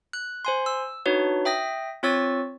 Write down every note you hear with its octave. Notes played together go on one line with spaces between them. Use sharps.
F#6
C5 G#5 C6
E6
D4 D#4 F#4 B4 C#5
E5 G5 D#6 A#6
C4 F4 C#5 C#6 E6 A6